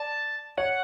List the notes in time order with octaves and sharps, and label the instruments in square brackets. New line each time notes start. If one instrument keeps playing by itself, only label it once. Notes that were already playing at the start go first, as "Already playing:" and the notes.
Already playing: [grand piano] D5 [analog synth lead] A5
[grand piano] C#5 [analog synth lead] F#5